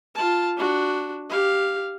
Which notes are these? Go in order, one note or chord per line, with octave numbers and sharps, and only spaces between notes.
F4 A5
D4 F#4
G4 F5